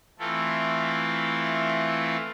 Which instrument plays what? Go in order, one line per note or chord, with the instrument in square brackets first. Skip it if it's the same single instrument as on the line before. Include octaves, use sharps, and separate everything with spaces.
[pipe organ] E3 A3 C4 E4 F4 A4